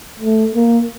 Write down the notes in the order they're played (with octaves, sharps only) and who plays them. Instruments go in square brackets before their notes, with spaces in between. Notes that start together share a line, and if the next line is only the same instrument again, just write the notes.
[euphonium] A3
A#3